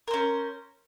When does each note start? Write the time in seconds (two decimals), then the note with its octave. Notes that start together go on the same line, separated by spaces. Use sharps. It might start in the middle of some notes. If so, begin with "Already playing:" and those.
0.08 A#4
0.11 C5
0.14 C#4